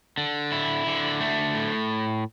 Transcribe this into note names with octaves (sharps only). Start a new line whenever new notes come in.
D3
E4
D3
A3
A2